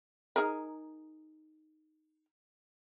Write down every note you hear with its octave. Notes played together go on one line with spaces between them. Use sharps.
D#4 G#4 A#4